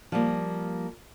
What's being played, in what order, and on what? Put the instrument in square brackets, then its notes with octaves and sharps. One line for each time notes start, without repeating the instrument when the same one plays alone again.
[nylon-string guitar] F3 G3 A#3